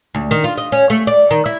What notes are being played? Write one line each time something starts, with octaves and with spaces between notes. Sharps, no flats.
D2
D#3
F4
D#5
C#4
A3
D5
D#3
E4